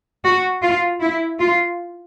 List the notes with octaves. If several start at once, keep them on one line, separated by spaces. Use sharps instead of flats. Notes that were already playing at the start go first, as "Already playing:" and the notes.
F#4
F4
E4
F4